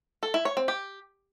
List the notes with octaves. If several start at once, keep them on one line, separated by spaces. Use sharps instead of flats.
A4
E4
C#5
C4
G4